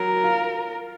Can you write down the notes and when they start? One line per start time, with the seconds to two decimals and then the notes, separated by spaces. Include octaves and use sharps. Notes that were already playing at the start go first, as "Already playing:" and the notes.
Already playing: F#3 A#4
0.24 F4